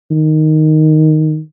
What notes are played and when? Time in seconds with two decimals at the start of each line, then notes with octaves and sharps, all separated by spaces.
0.11 D#3